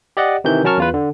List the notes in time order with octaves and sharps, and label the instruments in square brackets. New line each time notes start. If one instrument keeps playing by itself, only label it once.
[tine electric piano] G4 D5 D#5 F#5
C3 D#3 E3 G6
F#3 C#4 A#4 A5 C#6 F6
E2 F4 B4
D3